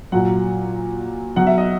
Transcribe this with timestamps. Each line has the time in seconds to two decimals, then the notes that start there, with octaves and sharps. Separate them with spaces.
0.12 A#2 F#3 F#5
1.36 B2 F#3 F#5
1.47 E5
1.58 D#5